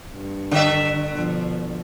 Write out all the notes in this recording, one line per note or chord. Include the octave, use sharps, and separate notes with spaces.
G2
D3 E5
B2 F3